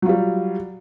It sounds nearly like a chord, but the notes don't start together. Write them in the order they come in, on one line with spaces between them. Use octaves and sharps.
F#3 F4 G3